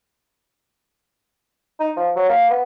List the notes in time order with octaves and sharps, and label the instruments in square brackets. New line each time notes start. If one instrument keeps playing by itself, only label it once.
[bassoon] D#4
F3
F#3
A#3
B3